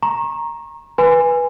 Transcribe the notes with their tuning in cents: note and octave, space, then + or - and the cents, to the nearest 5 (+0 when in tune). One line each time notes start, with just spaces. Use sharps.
A#5 +5 C#6 -35
B4 -10 G#5 -10 C6 -40